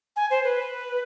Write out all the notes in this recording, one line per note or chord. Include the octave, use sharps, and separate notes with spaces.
G#5
C5
B4